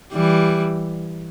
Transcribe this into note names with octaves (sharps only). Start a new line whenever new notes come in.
E3 G3